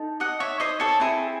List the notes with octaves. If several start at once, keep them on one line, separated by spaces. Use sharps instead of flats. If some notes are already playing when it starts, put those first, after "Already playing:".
Already playing: D#4 A4
D#5 F#5
C#5 E5
C5 D#5
A4 C#5
C4 E4 G#4